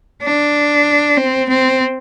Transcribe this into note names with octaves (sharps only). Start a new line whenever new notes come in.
D4
C4
C4